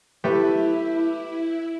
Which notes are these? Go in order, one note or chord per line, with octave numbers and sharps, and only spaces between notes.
A3 E4 G4 B4